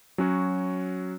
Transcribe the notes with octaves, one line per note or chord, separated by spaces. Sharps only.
F#3 C#4 F#4 C#5